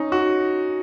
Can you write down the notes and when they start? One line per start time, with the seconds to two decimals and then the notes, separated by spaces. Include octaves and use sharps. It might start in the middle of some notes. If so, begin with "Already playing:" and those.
Already playing: C#4 D#4
0.12 F#4